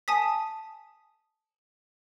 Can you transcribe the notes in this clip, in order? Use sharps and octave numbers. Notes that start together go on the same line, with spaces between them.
G#5 A5 D#6 B6